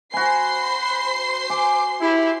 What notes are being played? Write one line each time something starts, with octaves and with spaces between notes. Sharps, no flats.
F#4 C5 G#5 B5 C6 C7
G#5 D6
E4 G4